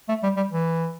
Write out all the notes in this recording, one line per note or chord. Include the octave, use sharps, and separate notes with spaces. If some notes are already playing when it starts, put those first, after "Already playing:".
A3
G3
G3
E3